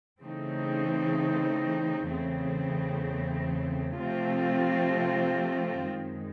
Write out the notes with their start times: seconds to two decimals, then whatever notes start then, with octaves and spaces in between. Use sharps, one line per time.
0.22 C#3 E3 A3 C4 D#4
2.10 E2 C#3 E3 A3 C4
3.98 C3 F3 A3 C4 F4
5.87 F#2 D#3 G#3